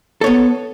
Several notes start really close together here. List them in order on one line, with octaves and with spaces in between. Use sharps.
A4 C#5 B3